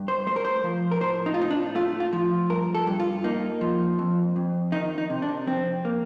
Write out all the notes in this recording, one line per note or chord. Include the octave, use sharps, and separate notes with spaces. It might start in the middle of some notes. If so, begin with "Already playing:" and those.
Already playing: G2
C5
A3 C5
A#4
C5
F3
A#4
A2 C5
D#4
F4
A2 D#4
D4
A3 F4
F4
F3
G2 A#4
A4
G2
F4
A#3 D#4
F3
F2
F2
D#3 D#4
D#4
C3
D4
F2 C4
A#3